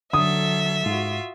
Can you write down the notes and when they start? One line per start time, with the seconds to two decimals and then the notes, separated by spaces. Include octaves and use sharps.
0.13 D3 F#3 A4 E5 D#6
0.86 G#2 F4 F#4